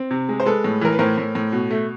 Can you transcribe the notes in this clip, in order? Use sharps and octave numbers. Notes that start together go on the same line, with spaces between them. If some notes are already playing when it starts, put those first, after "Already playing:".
Already playing: C4
C3
G#3
C5
G#3 A4 B4
A2
E3 A#4
B4
A2 A#4 C5
A2
A2
B2
A3